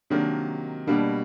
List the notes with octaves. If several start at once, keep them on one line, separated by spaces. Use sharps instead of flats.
C3 D#3 F#3 A#3 D4
B2 G3 A#3 D4